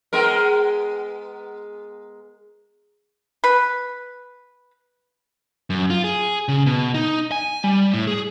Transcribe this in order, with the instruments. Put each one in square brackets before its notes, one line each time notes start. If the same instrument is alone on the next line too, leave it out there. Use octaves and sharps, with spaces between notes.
[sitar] G#3 B3 A#4
[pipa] B4
[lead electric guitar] F#2
F4
G#4
C#3
B2
D#4
G#5
G3
A2
G#4